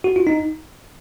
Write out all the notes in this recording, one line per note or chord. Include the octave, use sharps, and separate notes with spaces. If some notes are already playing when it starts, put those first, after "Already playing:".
F#4
F4
D#4